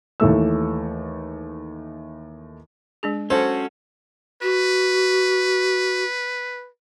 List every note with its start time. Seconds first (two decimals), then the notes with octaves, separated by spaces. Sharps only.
0.20 D#2 E3 A3 E6
3.03 G#3 D4 G#4
3.30 C#4 F#4 A4 C5
4.42 F#4 B4